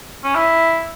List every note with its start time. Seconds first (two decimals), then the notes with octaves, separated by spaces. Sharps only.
0.24 C#4
0.35 E4